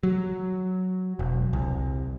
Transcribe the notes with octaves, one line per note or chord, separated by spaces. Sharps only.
F#3
E1
C2